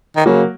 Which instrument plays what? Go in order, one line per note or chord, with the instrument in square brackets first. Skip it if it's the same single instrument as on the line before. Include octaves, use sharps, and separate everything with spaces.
[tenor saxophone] D#3
[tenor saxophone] C#3 [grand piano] F#3 A#3